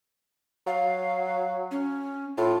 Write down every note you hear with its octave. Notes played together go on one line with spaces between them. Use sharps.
F#3 F5
C#4
A2 F4